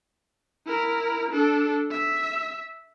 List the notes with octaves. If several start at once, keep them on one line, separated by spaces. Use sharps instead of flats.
E4 A#4
D4 A4
E5